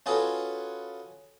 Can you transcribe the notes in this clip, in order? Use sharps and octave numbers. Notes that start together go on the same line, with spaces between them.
C#4 F4 F#4 G#4 A4 B4